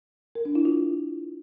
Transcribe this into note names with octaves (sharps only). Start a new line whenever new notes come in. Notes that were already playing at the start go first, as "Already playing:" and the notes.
A#4
D4
E4
F4